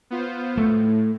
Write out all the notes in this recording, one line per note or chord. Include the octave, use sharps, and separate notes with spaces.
B3 F4 C5
A2 A3